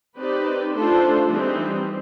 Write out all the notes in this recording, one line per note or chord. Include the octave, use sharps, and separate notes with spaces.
C4 D#4 G4 B4 D5
A3 D4 F4 A4 C5
E3 G3 C4 D#4